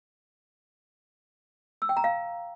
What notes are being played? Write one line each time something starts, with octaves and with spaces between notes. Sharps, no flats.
E6
G5
A#5
F5